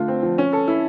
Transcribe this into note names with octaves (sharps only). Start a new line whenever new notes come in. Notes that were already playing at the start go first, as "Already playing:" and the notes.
Already playing: D3 A3 F4
C4
F3
C#4
A4
E4